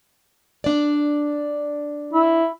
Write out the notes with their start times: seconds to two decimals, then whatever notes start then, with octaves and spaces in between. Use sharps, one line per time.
0.64 D4 D5
2.13 E4